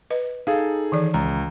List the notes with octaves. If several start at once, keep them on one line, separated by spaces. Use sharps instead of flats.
B4 D#5
D#4 G#4 A4 F5
D#3 E3 D5
C#2 A#5